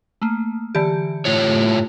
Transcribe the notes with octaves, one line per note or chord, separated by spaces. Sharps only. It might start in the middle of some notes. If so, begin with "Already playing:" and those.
A3 A#3
D3 E3 G4
A2 F4 C#5